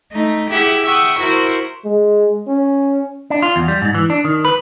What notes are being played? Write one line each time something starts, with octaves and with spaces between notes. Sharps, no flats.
A3 D#4
E4 G4 G#4 E5 F#5
E5 F#5 G5 C#6 D#6
E4 F#4 A#4 C5 E5
G#3
C#4
D4
F4
E2
G3
G#2
E3
D4
D#3
B4